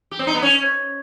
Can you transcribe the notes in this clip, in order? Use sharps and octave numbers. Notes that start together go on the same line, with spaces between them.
G4
C4
D#4
B3
C#4